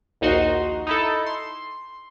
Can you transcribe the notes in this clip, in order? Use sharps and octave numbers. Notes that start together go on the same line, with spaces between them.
A#1 D#2 D#4 F#4 C6
D#4 E4 A4
C6